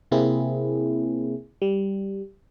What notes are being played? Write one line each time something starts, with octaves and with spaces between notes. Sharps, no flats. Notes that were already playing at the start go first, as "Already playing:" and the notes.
C3 A#3 C4 E4 G#4
G3